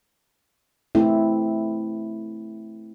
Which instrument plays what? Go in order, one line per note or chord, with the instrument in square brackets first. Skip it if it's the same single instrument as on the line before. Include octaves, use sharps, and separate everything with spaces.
[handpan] A3 C4 E4